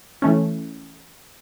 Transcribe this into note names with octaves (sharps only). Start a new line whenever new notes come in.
E3 A3 C#4